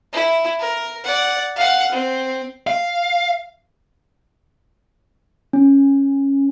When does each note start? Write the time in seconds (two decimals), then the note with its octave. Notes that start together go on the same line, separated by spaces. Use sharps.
0.13 E4
0.59 A#4
1.04 D5 F#5
1.56 F5 F#5
1.92 C4
2.67 F5
5.53 C#4